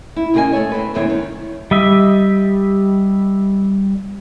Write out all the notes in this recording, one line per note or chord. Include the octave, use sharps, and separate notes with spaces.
E4
E2 C#3 A#3 G#4 D#5 G#5
A3 A4 C#5
C4 B4
F#2 C3 E3 B3 C4 C#5
D#3
G3 D#5 E5